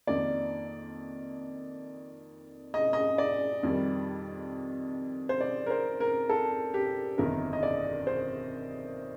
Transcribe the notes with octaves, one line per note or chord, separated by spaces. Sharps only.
F2 D#3 A#3 D5
D#5
D#5
D5
F2 D#3 G3
C5
D5
A#4
C5
A#4
A4
G4
G1 F2 D#3 A#4
D#5
D5
C5